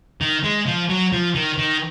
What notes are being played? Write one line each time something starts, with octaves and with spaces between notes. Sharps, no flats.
D#3
G#3
F3
F#3
F3
D#3
D#3